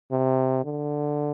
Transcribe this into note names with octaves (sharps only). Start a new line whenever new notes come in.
C3
D3